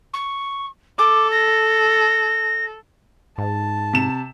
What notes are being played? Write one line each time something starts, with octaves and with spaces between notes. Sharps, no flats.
C#6
A4 D6
A#6
G#2 A5
C3 E7